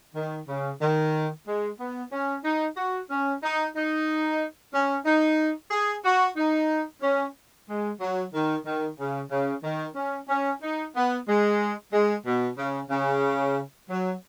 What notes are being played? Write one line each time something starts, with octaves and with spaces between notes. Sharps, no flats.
D#3
C#3
D#3
G#3
B3
C#4
D#4
F#4
C#4
D#4
D#4
C#4
D#4
G#4
F#4
D#4
C#4
G#3
F#3
D#3
D#3
C#3
C#3
D#3
C#4
C#4
D#4
B3
G#3
G#3
B2
C#3
C#3
F#3